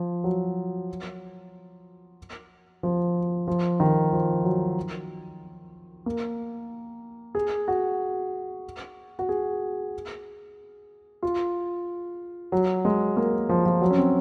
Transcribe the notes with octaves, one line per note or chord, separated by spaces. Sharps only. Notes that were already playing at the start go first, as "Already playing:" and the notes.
Already playing: F3
F#3
F3
F3
D#3
F3
F#3
A#3
G#4
F#4
F#4
G#4
F4
F#3
G#3
A#3
F3
F3
F#3
C#4
C4